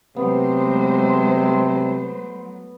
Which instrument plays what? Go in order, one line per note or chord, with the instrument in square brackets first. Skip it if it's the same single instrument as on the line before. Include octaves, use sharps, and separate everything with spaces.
[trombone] C3 [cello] F#3 A3 [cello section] G#3 C5 [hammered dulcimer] B3